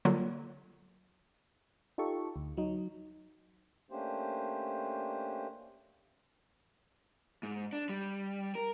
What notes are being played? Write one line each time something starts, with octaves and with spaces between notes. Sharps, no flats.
D3 F#3 G3 A#3 F4
D#4 F4 G4 A4 C#6
D2
F#3 D#4
A3 A#3 C#4 D4 G4 C5
G#2
D4
G3
A#4